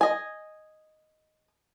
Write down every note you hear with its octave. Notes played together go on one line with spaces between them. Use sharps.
D#5 G#5